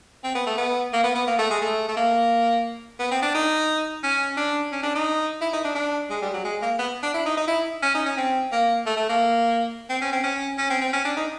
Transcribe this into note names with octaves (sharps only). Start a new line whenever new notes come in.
C4
B3
A3
B3
A#3
B3
B3
A#3
A3
G#3
A3
A3
A#3
B3
C4
D4
D#4
C#4
D4
C#4
D4
D#4
E4
D#4
D4
D4
G#3
G3
F#3
G#3
A#3
B3
D4
E4
D#4
D#4
E4
C#4
D#4
C#4
C4
A#3
A3
A3
A#3
C4
C#4
C4
C#4
C#4
C4
C4
C#4
D4
D#4